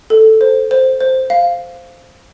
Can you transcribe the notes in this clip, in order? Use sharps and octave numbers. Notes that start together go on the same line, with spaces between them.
A4
C5
C5
C5
F5